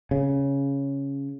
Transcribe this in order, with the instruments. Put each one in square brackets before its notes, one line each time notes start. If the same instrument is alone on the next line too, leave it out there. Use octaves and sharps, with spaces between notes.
[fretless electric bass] C#3